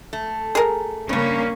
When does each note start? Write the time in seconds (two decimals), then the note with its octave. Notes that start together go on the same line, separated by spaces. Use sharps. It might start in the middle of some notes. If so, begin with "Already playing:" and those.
0.13 A3
0.55 G#4 A#4
1.09 G2 C#3 A#3 C#4